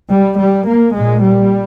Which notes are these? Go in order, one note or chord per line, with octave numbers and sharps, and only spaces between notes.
G3
G3
A#3
A#1 A#2 G#3
G3